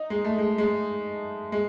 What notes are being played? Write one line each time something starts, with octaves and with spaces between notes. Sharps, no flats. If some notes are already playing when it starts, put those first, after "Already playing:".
Already playing: D#4
G#3
A3
G#3
G#3
G#3